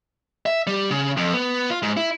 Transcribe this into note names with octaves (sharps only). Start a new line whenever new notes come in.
E5
G3
C#3
F2
B3
F4
G#2
E4